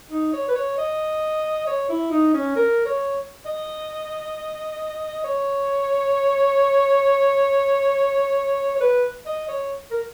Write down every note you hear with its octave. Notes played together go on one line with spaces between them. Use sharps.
D#4
C#5
B4
C#5
D#5
C#5
E4
D#4
C#4
A#4
C#5
D#5
C#5
C#5
B4
D#5
C#5
A#4